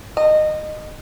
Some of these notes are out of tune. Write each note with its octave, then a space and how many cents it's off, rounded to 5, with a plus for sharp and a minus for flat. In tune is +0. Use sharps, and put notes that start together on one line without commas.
D#5 -20